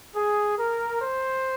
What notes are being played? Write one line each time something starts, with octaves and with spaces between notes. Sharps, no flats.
G#4
A#4
C5